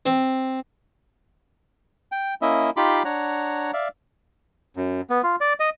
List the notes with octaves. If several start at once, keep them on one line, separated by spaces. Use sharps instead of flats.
C4
G5
A#3 C#4 E4 D#5 E5
D#4 F4 G4 B5 C6 D6
D4 C#5 F#5 A#5
D5 E5 F5
F#2
B3
F4
D5
D#5